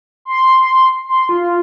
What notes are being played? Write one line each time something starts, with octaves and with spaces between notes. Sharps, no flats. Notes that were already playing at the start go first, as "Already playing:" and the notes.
C6
C6
F4